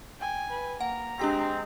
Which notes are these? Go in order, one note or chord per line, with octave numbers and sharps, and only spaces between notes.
G5 G#5
B4
A#3 F#5 A#5
G#3 C4 D4 G4 A#6